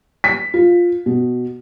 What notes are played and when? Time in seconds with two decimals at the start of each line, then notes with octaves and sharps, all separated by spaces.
0.24 B6
0.54 F4
1.06 B2